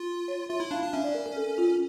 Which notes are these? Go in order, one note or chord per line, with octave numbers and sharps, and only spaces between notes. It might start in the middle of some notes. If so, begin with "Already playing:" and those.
Already playing: F4
C#5
F4 E5
E4
D4 F5
D4
C#4 E5
D5
A#4
A#4
A4
F4